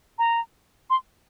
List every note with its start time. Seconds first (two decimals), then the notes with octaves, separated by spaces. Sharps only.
0.18 A#5
0.90 C6